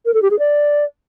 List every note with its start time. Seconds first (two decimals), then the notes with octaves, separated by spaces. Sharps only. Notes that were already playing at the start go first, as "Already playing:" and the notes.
0.06 A#4
0.14 A4
0.22 G4
0.31 G#4
0.39 D5